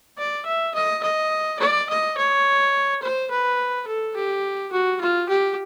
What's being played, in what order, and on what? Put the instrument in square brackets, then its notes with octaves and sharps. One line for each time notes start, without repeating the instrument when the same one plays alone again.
[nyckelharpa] D5
E5
D#5
D#5
D5
D#5
C#5
C5
B4
A4
G4
F#4
F4
G4